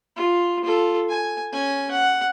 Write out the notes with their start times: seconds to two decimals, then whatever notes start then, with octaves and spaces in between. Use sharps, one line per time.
0.16 F4
0.64 F4 A4
1.09 G#5
1.52 C#4 G#5
1.91 F#5